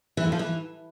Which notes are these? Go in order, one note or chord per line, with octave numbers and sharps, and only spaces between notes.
E3
F2
F3
E3